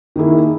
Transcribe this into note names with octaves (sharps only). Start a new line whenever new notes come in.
D#3 A#3 E4 G#4